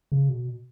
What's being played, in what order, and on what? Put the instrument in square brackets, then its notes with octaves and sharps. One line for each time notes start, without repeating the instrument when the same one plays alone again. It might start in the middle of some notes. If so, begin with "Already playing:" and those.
[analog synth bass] C#3
B2